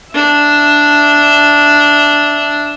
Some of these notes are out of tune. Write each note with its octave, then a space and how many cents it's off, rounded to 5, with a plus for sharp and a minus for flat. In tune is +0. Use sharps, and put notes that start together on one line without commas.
D4 -5 E5 +0